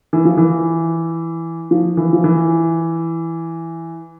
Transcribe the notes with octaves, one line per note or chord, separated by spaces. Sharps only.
E3
F3
E3
F3
E3
F3
E3